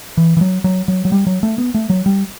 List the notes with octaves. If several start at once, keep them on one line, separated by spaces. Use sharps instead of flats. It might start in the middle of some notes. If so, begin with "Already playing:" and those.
E3
E3
F#3
F#3
F#3
F#3
G3
F#3
A3
B3
A3
F#3
G3